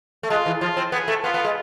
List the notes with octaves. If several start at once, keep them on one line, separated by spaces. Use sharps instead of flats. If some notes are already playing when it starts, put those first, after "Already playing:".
A3
G#3 F4
E3
F3 F4
C4
B3 G#4
A3
B3 F4
B3
G#3